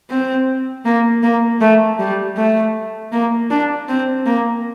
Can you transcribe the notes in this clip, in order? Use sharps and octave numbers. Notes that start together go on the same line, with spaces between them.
C4
A#3
A#3
A3
G3
A3
A#3
D4
C4
A#3